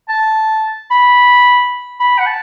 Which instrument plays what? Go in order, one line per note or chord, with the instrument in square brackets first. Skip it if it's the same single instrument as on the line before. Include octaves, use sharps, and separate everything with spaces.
[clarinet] A5
B5
B5
F#5
A5